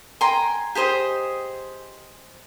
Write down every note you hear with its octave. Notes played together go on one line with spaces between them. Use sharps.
G5 G#5 A#5 C6
G4 G#4 C5 D#5